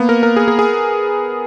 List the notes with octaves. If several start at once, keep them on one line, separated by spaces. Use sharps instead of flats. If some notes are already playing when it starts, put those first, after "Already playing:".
Already playing: A#3 B3
A#4
A#4
G#4
G#4
G#4